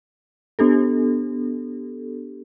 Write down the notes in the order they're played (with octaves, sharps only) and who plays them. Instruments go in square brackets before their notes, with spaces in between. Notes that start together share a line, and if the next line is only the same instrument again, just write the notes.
[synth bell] B3 D4 G4 A4